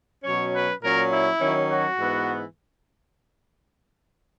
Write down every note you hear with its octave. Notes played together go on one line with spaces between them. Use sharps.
B2 F#3 C#4 C#5
B4
A#2 F#3 C#4 A#4
E4
D#3 F#3 C#4
F#4
G#2 E3 B3